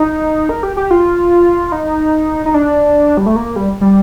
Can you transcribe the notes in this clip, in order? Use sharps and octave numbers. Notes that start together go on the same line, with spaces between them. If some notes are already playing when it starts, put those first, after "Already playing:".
Already playing: D#4
A#4
G4
G4
F4
D#4
D#4
D4
G3
A3
A#3
G3
G3